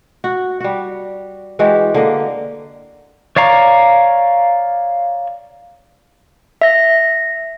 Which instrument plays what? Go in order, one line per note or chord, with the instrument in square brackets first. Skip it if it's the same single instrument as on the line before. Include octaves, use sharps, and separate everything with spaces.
[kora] F#4
G3 F#4
E3 G#3 F#4 G4
D3 A#3 D#5
[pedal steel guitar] C#5 D5 F5 A#5 C#6
[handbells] E5 A#6